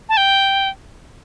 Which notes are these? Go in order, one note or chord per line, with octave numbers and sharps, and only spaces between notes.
A5
G5